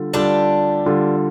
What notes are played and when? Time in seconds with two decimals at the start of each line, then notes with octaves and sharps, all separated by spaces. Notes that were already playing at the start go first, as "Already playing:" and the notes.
Already playing: D3 G3 F4 A4
0.14 D3 G3 D4 F4 G4 A4
0.86 D3 G3 F4 A4